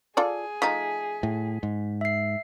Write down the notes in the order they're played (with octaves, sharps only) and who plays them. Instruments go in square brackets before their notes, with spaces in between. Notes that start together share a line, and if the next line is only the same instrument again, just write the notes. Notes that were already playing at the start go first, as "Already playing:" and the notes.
[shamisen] F4 A4 D5 [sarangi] G#4
[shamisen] F3 A3 D#4 [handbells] B6
[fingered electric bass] A2
G#2
[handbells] E5 C7